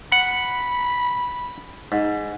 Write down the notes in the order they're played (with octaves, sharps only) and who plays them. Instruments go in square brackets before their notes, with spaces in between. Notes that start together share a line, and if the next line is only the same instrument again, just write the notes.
[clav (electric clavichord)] F#5 [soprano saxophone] B5
[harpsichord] G#2